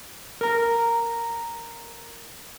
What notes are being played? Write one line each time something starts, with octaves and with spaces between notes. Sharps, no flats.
A#4 A#5